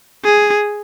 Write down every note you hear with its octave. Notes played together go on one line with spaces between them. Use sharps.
G#4